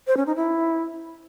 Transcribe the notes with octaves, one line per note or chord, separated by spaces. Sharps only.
C5
C#4
D#4
E4